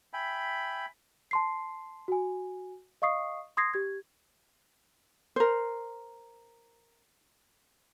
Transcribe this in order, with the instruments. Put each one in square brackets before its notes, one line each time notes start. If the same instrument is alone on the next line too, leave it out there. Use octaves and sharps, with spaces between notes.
[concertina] E5 G5 G#5 B5
[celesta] A5 C6 C7
F#4 G#5
D#5 F5 C#6 D#6 C7
C6 D#6 G#6 A#6 C7
G4 G#6
[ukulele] A#4 C5